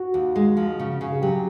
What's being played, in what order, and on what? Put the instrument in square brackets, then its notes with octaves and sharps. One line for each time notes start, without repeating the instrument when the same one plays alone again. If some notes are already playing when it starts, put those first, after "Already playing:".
Already playing: [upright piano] F#4
[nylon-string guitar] D#2
G#3
F3
C#3
C#3
[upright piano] G#4
[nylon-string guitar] F#3 [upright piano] G4